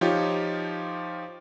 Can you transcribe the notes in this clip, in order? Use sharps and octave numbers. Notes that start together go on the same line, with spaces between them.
F3 D#4 F4 G4 C#5